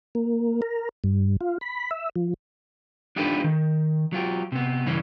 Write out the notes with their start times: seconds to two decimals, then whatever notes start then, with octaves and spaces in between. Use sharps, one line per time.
0.15 A#3
0.62 A#4
1.04 G2
1.41 F4
1.61 B5
1.91 E5
2.16 F3
3.16 D4 D#4 F4 G4 A4 B4
3.44 D#3
4.13 F#3 F4 G4
4.52 C3 B3
4.86 G2 C#3 E3 C#4